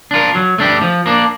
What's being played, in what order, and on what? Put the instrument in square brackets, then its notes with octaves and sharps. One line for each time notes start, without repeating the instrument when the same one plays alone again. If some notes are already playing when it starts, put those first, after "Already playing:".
[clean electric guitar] D4 F4 A#4
F#3
A3 D4 G4
F3
A#3 D4